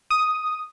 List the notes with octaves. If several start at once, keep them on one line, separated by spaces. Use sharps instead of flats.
D#6